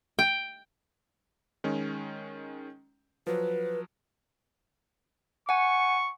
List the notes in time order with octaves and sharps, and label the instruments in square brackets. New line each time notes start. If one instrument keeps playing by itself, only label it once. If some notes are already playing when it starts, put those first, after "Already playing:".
[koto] G5
[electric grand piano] D#3 G#3 C#4
[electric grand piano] F3 F#3 [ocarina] B4
[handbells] F#5 G#5 [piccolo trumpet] C#6